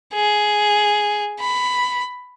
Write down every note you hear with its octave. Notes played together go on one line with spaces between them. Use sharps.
G#4
B5